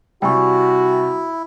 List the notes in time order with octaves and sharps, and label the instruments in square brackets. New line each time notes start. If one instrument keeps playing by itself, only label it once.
[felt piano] C3 G3 [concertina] E4 [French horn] F#4 [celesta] G5 G#5 C#6